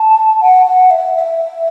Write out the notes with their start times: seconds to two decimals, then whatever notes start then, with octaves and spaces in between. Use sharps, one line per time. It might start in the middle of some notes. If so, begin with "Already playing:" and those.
Already playing: A5
0.41 F#5
0.66 F#5
0.91 E5
1.15 E5